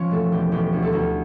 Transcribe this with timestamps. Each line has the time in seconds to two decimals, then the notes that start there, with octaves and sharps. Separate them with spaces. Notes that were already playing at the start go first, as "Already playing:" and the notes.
Already playing: F3 C#4 C#5
0.11 E1 A3 A4
0.32 E1 G4
0.52 E1 G4
0.73 D2
0.83 A3 A4
0.93 D2